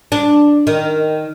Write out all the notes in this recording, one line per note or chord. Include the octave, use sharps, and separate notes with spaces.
D4
D#3